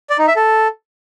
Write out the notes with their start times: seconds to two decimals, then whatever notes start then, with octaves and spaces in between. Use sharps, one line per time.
0.10 D5
0.19 D#4
0.28 E5
0.36 A4